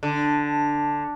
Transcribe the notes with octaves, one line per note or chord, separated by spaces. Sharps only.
D3